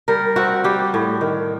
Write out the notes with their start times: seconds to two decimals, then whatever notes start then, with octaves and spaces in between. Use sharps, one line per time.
0.08 G3 A#4
0.36 C4 F#4
0.64 G3 G4
0.94 A2
1.21 D#3